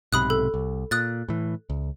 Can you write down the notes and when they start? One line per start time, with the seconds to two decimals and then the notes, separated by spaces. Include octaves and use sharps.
0.13 B1 G#2 C3 B5 D#6 F#6
0.30 A4
0.54 C2
0.91 A#2 D#6 F#6 A6
1.28 A2 E3
1.70 C#2